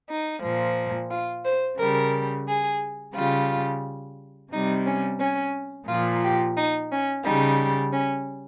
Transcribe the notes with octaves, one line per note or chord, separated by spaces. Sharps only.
D#4
A#2 F3
F4
C5
C#3 G3 A#4
G#4
C#3 G3 F4
C3 G3 D#4
C#4
C#4
A#2 F3 F4
G4
D#4
C#4
C#3 G3 D#4
C#4